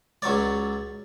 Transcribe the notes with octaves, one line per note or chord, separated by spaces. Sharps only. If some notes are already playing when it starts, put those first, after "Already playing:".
C#2 F#3 C#5 D5